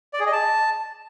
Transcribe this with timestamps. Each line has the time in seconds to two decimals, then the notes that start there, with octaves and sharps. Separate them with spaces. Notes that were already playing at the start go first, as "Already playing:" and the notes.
0.13 D5
0.20 G#4
0.26 D#5
0.33 A5